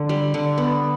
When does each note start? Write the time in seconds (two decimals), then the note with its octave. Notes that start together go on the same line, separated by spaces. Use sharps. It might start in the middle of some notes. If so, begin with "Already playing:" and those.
Already playing: D3
0.09 G3
0.34 D3
0.58 B3